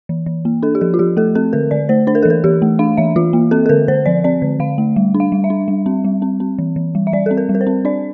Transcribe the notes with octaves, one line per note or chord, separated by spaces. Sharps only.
E3
E3
A#3
D4 A4
G4
F3 A4
F4
F3 G4
A3 A4
C4 A4
D3 A#4
D3 D5
A3 C5
D4 C5
A#4
A4
E3 A#4
E3 G4
A3
D4 F5
E3 E5
E3 F4
A#3
C4 A4
A4
D3 A#4
D3 C5
F3 D5
C4 D5
D3
D3 F5
A3
G3
D4
F5
G3
E5
D4
G3
C4
G3
C4
C4
E3
E3
G3
E5
G3 D5
C4 A4
A#4
G3
A#4
C5
C4
D4 D5